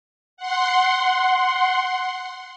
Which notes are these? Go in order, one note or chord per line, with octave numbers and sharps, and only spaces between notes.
F#5 C6